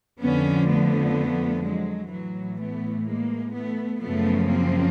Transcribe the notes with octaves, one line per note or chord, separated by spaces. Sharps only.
F2 D3 F3 B3 C#4
A3 B3
F#3 G#3
A2 E3 F#3
A3 B3
G#3 A#3
A3 B3
F#2 C#3 F3 A3 B3
A#3 C4